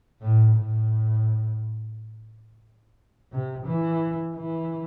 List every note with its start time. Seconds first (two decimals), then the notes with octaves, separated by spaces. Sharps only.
0.21 A2
0.56 A2
3.31 C3
3.66 E3
4.35 E3